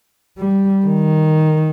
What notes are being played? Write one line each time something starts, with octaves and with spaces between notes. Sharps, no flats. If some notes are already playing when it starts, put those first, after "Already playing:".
G3
D#3